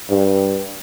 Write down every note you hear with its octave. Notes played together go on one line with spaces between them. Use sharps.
G2